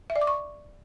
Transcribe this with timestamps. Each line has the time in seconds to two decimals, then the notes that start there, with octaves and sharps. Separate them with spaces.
0.10 E5
0.16 D5
0.21 D6
0.27 C#6